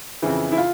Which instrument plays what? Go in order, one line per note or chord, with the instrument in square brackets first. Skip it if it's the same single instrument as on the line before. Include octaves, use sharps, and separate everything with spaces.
[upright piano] F2 C#3 E3
E4
F4